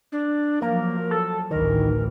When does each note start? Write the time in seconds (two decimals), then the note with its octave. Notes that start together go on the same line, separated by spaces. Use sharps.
0.12 D4
0.62 F3 F#3 A#3 A#4
1.11 A4
1.51 A1 D2 D#3 E3 A#4